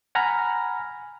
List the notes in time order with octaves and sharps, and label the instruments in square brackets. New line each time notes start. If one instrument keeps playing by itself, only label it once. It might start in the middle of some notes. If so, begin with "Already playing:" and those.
[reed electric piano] F#5 G#5 A#5 B5 F6